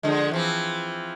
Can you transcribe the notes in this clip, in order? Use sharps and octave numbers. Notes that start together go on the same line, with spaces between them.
D3 F3 G#3
E3 F3 C4